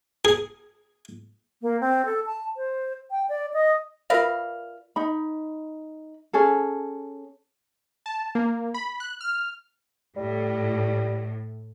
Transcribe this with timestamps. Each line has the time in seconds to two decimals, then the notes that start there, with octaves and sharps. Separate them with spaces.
0.25 G#4
1.62 A#3
1.81 C4
2.05 A4
2.26 A5
2.57 C5
3.11 G5
3.29 D5
3.53 D#5
4.10 F4 A#4 B4 D5 E5 F5
4.96 D#4 B5
6.33 C#4 G#4 A4
8.06 A5
8.35 A#3
8.74 B5
9.00 F#6
9.21 F6
10.16 A2 G3